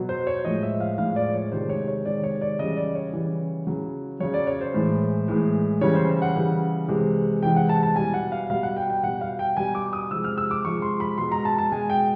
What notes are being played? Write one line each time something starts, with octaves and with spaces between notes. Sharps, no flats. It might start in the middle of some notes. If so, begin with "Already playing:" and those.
Already playing: B2 F#3
C5
C#5
A2 F3 G#3 D#5
E5
F5
A2 F3 G#3 F5
D5
C#5
C3 D#3 G#3 C5
C#5
C#5
C3 D#3 G#3 D5
C#5
D5
C#3 E3 G3 D#5
D5
C#5
C#3 E3 G3
C#3 F#3
C#3 F#3 C#5
D5
C#5
C5
A2 E3 G#3
A2 E3 G#3
C#3 E3 G3 C#5
C5
F#5
C#3 E3 G3
C3 E3 G#3
C3 E3 G#3 G5
F#5
A5
A5
B2 G3 G#5
F#5
F5
B2 G3 F5
F#5
G5
G5
B2 G3 F#5
F5
G5
B2 G3 G#5
D6
D#6
C3 F3 G#3 E6
F6
E6
D6
C3 F3 G#3 C#6
C6
B5
B2 G#3 C6
A#5
A5
A5
B2 G#3 G#5
G5